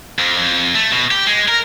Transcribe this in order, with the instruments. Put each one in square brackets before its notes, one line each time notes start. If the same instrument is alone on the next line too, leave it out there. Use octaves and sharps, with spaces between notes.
[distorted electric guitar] F2
F2
A3
B2
G4
G#3
A#4